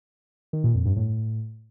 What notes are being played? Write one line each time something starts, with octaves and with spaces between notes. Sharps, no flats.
D#3
A#2
F2
G2
A2